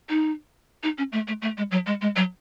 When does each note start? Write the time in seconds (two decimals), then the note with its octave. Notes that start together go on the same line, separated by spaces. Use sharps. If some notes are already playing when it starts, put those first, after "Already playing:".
0.09 D#4
0.83 D#4
0.98 C#4
1.12 A3
1.28 A3
1.42 A3
1.57 G#3
1.71 F#3
1.86 G#3
2.01 G#3
2.16 F#3